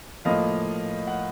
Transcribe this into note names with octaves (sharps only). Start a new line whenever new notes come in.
A2 F3 A#3 D#5 F5
F#5